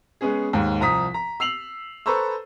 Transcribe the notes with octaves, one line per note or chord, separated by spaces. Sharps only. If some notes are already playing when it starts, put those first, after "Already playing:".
G#3 B3 C#4 G#4
D#2 G#2
C2 F3 A#5 D#6 B6
A#5
E6 C7 F7 F#7
A4 B4 C5 A#5 C#6 E6